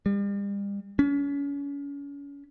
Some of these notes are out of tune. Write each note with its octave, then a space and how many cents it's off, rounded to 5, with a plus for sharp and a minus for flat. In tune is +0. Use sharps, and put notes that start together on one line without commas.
G3 +40
C#4 +35